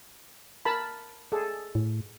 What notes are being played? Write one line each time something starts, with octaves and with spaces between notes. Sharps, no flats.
A#4 A5 B5
G#4 A4
A2